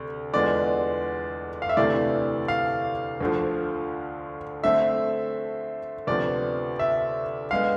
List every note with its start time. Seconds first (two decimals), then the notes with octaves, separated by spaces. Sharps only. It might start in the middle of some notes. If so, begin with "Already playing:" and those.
Already playing: D2 C3
0.33 E2 D3 G#3 B3 F4 D5
1.62 F5
1.69 E5
1.77 D2 C3 E3 A3 D5
2.48 F5
3.21 D2 D3 F3
4.64 D3 A3 C4 E5
6.07 D2 C3 F3 B3 D5
6.79 E5
7.51 D3 G#3 B3 F5